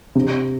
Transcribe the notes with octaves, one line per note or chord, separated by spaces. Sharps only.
C3